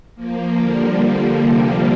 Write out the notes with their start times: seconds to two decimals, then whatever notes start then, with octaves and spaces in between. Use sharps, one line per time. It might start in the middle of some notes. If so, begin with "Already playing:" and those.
0.15 F3 A#3
0.57 D3 G3
0.98 D3 G3
1.40 C3 F3